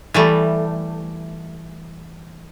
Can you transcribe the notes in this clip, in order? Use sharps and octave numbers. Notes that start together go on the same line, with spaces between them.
E3 G3 A3